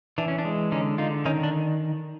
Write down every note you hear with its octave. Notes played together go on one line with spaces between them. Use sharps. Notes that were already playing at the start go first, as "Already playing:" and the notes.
E3 D4
C#4
D4
G#3
D3 C#4 D#4
D3 D#4 F4
D#3 C#4 D#4
D4